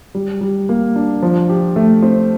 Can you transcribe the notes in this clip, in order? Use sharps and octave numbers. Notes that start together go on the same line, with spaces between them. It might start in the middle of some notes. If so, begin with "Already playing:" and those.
G3
G3
A#3
D4
F3
G4
A3
C4